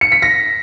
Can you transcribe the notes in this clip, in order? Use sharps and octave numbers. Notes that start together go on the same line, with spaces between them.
C#7
B6
A#6